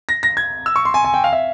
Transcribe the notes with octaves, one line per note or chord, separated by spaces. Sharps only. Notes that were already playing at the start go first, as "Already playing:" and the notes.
A#6
A#6
G#6
E6
C#6
C6
G#5
G#5
G5
F5
E5